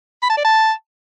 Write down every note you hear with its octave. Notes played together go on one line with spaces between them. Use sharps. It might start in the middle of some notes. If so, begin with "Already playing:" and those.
B5
A5
D5
A5